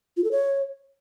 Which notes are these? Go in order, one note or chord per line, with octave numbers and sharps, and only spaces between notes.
F4
A4
C#5